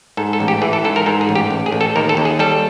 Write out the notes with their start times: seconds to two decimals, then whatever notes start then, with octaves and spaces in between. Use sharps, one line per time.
0.17 G#2 A4
0.33 A4
0.40 A1
0.48 G4
0.62 E3 G#4
0.73 A4
0.84 G#2 A4
0.96 A#4
1.06 G#2 A4
1.21 G#4
1.29 A1
1.35 G4
1.51 A1
1.66 G#4
1.72 A1
1.81 A4
1.96 D#2 A#4
2.09 A4
2.17 D#2
2.25 G#4
2.39 G3 A4